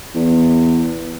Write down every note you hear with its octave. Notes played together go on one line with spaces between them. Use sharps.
E2